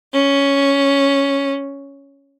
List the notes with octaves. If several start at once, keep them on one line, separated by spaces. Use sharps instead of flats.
C#4